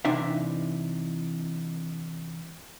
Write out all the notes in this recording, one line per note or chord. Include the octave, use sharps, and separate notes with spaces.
C3 E3 D4 D#4 E5